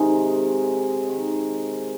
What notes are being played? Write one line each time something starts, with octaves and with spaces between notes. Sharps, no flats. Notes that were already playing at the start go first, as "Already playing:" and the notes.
Already playing: C3 D#3 G#3 G#4
C3 D#3 G#3